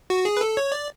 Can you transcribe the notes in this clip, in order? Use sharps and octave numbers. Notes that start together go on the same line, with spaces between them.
F#4
G#4
B4
A4
C#5
D5